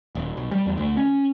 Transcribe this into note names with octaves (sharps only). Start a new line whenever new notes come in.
D#1
B1
G3
E2
D2
C#4